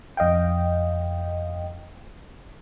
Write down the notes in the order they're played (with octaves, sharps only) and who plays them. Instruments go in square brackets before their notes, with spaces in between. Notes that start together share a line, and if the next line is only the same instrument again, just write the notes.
[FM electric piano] F2 D#5 F5 G5